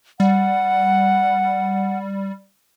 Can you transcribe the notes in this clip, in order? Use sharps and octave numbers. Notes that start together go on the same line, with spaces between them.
G3 F#5